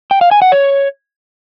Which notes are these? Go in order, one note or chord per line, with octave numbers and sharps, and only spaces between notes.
G5
F5
G#5
F#5
C#5